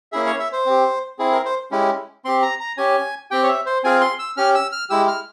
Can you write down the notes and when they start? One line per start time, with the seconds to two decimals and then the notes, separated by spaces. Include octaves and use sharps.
0.12 A#3 C#4 E4 G#4 E5
0.26 C#5
0.39 E5
0.52 C5
0.66 C4 G4
1.19 C4 E4 G#4
1.32 A#4
1.45 C5
1.71 G#3 C#4 E4 G4
2.25 C4 G4 C6
2.42 A#5
2.60 A#5
2.77 C#4 G4 G#5
3.31 C4 G4 G5
3.43 C#5
3.48 E5
3.66 C5
3.84 C4 F4 G#4 G#5
4.01 C6
4.19 E6
4.37 C#4 G4 F6
4.55 E6
4.72 F6
4.90 G#3 E4 G4 E6
5.08 F6